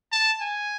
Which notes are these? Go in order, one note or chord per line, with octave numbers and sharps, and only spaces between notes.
A5
G#5